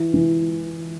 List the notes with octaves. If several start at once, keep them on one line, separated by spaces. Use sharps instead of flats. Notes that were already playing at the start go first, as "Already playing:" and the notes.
Already playing: E3
E3